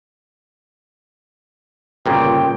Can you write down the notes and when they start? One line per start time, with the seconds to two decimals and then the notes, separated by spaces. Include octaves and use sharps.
2.06 G1 A#2 C#3 G5